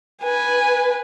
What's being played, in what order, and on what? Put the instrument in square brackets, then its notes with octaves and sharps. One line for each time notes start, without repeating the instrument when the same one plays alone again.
[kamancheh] B4 G#5